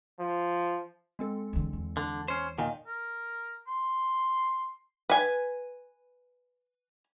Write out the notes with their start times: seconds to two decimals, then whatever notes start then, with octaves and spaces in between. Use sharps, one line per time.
0.19 F3
1.19 G#3 C4 A4
1.53 E2 D3
1.73 E2
1.97 D3
2.28 C#4 C5
2.58 A#2 D#3 D#5 F5 G#5
2.87 A#4
3.68 C6
5.09 B4 G#5